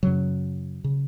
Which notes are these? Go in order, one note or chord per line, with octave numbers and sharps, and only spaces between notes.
F#2 C#3 F#3
C#3